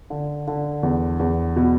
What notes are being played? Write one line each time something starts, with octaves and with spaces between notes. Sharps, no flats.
D3
D3
E2
E2
B2